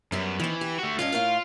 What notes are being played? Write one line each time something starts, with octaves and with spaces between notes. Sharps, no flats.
F#2 G3 B3
D#3 E3 C4
G4
A3 F#4
G2 C#4 F4 D#5
A2 A#4 F5